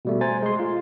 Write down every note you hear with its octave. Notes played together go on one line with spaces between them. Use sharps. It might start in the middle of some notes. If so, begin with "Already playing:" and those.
B2 G3 A3
C5 G#5 A#5 A6
G#3 C6
F4